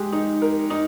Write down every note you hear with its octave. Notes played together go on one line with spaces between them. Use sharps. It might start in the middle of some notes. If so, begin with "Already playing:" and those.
Already playing: G#3 G4
D#4
A#4
D#4